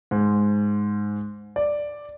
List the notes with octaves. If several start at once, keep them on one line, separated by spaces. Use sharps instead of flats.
G#2
D5